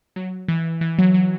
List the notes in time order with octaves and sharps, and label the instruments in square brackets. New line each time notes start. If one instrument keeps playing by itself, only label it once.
[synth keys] F#3
E3
E3
F#3
F#3